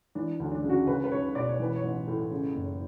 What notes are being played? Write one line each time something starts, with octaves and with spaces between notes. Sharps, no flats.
E3 D4
D2
D4
C#3
F#4
C#2 B4
B4
C#2 C#5
B2 D5
C#5
E3 B4
C#5
A1
A2
C#3
F#1